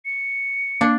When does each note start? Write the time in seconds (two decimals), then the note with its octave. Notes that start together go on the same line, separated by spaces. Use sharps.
0.05 C#7
0.81 A#3 D4